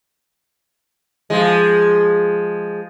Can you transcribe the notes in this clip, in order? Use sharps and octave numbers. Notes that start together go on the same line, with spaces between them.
F3 G#3